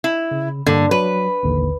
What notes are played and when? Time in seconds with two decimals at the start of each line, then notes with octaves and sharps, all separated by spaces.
0.04 E4
0.31 C#3
0.66 G2 D3 A#3
0.91 F#3 B4
1.43 A1 D#2 D3